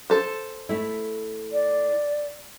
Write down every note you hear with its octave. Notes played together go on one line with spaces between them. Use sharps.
A4 C5
A3 E4
D5